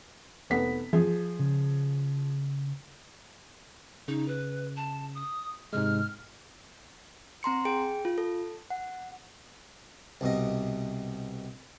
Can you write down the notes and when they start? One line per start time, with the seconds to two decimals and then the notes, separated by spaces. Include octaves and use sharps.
0.50 F1 B3 B6
0.93 F3 G#4
1.39 C#3
4.08 C#3 D#4
4.28 B4
4.77 A5
5.15 D#6
5.73 G#2 C3 G#3 F6
7.43 C4 A#5 C6 C#7
7.65 G#4 G5 D7
8.05 F4
8.18 A4
8.70 F#5
10.21 C2 B2 D#5